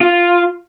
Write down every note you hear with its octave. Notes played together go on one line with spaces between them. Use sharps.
F4